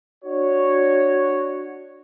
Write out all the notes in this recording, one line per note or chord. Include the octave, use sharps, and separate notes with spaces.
D4 F#4 C#5